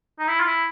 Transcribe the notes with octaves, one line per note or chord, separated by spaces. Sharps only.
D#4
E4
F4
E4